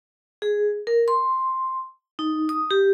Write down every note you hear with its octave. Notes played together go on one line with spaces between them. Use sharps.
G#4
A#4
C6
D#4
D#6
G4